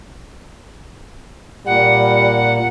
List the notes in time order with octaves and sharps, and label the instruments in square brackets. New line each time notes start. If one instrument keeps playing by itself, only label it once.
[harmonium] A#2 [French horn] G3 [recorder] F#5